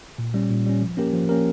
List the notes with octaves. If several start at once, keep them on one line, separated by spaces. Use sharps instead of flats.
A#2
G3 C#4
A#2
G3 C#4
F3
A#3 C#4 G4 A#4
F3
A#3 C#4 G4 A#4